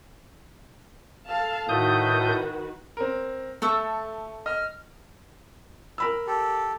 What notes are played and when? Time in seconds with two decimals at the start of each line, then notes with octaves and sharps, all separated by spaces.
1.27 A4 F5 A5
1.69 A2 D#3 F#4 B4 D#6 G6
2.97 C4 A#4
3.62 A3 A4 C#6 E6
4.46 D#5 F6
5.98 A#4 B5 E6
6.27 G4 A4